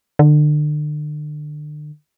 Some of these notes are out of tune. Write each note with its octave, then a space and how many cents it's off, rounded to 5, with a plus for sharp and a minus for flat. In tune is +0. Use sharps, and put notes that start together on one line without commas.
D3 +35